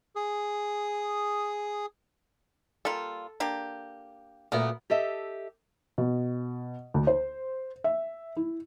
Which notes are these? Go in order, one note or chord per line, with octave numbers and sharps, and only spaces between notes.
G#4 D#6
G3 A#3 F4 A4
A#3 D4 G4
F#2 A#2 A3 B3 A#4
G4 A4 D#5 E5
B2
D2
C5
E5
E4